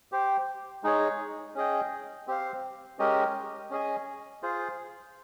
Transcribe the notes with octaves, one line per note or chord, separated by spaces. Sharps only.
G4 C5 G5
G#3 D#4 G#4 C#5
C#4 G#4 D#5 G5
C4 G4 C5 F5
G#3 C#4 G4 A#4 D#5
C#4 G#4 D#5 G#5
F4 G#4 C5